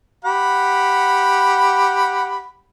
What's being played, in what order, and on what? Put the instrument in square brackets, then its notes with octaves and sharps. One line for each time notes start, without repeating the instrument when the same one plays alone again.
[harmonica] G4 F#5 B5